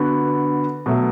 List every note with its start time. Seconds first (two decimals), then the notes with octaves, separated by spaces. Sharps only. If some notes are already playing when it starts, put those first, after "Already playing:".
Already playing: D3 B3 F#4
0.86 B2 F#3 A3